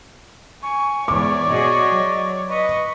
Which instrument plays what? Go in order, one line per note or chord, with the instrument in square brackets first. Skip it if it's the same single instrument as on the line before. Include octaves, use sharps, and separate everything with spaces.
[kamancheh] G#5 [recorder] C#6
[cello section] E2 G#2 [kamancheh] C#5 D5 [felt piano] D6
[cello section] B2 F#4 G#4 [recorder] D#5
[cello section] F#3
[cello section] B4 [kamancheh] D#5 [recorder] C#6